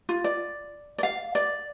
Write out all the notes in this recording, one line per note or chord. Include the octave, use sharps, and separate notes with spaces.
F4
D5
D5
F5
D5